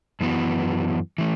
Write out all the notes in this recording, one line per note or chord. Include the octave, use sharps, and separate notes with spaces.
F#2 E3 B3 F#4
E3 A3